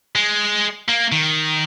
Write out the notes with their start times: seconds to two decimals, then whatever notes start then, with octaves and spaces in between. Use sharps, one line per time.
0.16 G#3
0.89 A#3
1.12 D#3